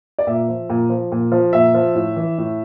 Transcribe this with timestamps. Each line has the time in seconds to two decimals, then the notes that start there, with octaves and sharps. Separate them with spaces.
0.19 D5
0.27 A#2 E5
0.49 F3
0.70 A#2
0.90 F3
1.12 A#2
1.32 F3
1.53 A#2 E5
1.74 F3
1.95 A2
2.16 E3
2.38 A2